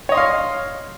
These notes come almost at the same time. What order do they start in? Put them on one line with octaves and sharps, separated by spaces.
C#5 D#5 C6 F5